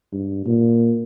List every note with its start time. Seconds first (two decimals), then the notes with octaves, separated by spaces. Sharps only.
0.13 G2
0.46 A#2